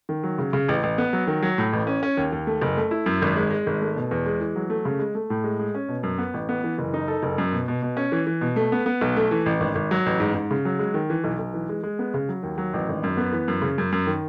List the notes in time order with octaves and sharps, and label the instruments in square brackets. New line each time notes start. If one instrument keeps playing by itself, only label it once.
[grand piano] D#3
F#3
C#3
C#3
A1
A1
B3
F#3
D#3
F#3
A2
A1
C#4
C#4
D#2
D#2
A3
F#1
A3
E4
F#2
G#1
G#3
G#3
G#1
A3
B2
E2
G#3
E3
F#3
A3
C#3
G#3
A3
A2
G#3
G#3
C#4
B2
F#2
B3
A1
B3
E3
F#1
D#4
A4
F#1
F#2
B2
B2
B2
C#4
E3
E3
B2
A3
B3
B3
B1
A3
E3
A1
G#1
G#1
F#3
A1
G#2
G#2
C#3
F#3
G#3
D#3
E3
B1
B1
E3
G#3
G#3
B3
C#3
F#3
D#2
F#3
A1
G#1
F#2
B3
E3
F#2
C#3
F#2
F#2
D#3